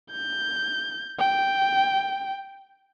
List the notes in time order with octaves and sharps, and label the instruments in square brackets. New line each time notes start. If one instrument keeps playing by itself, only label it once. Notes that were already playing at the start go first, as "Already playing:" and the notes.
[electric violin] G6
G5